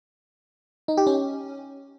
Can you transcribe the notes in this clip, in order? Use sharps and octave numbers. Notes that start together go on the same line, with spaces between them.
D#4
G4
C#4